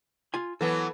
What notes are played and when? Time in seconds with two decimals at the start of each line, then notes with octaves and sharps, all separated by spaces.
0.34 F4 G#5
0.61 E3 F#3 B3 A4 B4